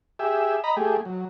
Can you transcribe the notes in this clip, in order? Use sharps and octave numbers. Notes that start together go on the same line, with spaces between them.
G4 G#4 E5
D#5 A#5 B5
A3 G4 G#4
F#3